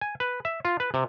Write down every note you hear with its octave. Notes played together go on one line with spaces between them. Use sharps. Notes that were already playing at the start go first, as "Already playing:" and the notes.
G#5
B4
E5
F4
B4
C3